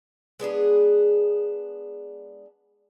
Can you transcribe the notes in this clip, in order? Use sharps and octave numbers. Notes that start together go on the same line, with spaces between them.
G#3 B3 D4 G#4